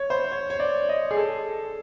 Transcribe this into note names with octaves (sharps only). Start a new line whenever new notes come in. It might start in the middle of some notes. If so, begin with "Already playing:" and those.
Already playing: C#5
C5
C#5
C#5
D5
D#5
G#4
A4